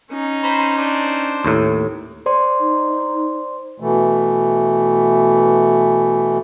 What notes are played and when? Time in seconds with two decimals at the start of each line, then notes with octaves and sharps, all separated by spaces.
0.11 C#4 D#4
0.44 C5 A#5 B5
0.78 D4 C5
1.45 D#2 A2
2.26 C5 D5 C6
2.61 D#4
3.80 B2 E3 A3